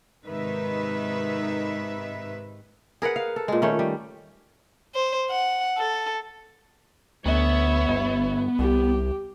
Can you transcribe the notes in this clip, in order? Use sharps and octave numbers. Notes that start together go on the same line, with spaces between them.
G#2 C3 D#3 D#4 B4 E5
G#4 A#4 B4 F#5
F5
A4
A#2 G#3
D#3 A3 C#4
G3
C5
F#5
A4
D2 B3 C#5 E5
G1
C2 G4